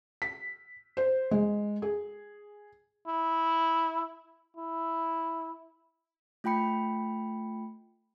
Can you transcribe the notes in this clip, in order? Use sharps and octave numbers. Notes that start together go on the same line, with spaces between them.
B6
C5
G#3
G#4
E4
E4
A3 F4 G5 B5 C#7